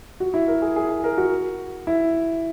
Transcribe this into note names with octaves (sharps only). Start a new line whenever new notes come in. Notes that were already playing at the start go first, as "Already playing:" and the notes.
F#4
E4
A#4
G#4
G#4
G#4
A#4
F#4
E4